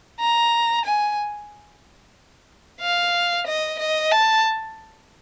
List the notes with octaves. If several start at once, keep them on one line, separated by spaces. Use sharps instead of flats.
A#5
G#5
F5
D#5
D#5
A5